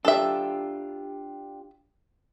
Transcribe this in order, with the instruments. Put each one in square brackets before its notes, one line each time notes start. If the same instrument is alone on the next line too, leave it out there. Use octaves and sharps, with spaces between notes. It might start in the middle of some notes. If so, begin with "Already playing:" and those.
[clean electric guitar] D4 F4 G4 [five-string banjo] A4 E5